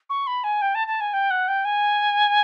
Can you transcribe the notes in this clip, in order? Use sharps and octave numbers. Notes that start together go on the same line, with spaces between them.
C#6
B5
G#5
G5
A5
A5
G#5
G5
F#5
G5
G#5